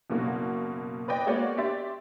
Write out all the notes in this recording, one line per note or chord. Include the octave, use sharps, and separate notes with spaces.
F#1 B2 A#3 F#4
B4 D5 D#5 G5
G#3 A#3 B3 F#4 C#5 D5
G4 D5 E5 C6 A6